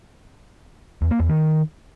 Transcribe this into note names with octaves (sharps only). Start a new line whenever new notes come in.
E2
A#3
E2
D#3